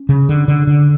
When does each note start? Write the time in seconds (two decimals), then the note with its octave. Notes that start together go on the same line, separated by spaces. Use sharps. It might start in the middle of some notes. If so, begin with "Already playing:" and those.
Already playing: C#4
0.09 C#3
0.29 D3
0.48 D3
0.67 D3